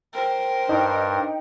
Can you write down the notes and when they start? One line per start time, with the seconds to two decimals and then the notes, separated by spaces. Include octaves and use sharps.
0.14 A#4 C5 G5
0.69 G2 D#4